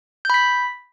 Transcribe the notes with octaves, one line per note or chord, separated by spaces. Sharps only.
B5 G6 B6